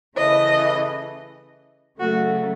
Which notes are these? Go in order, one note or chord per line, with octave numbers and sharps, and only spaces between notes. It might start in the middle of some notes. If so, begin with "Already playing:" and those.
C#3 E3 A3 D#5
C#3 F#3 A3 F#4